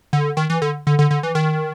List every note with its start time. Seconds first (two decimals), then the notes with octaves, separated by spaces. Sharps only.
0.13 D3
0.37 D#3
0.50 E3
0.62 D3
0.87 D3
0.99 D3
1.11 D3
1.23 E3
1.35 D#3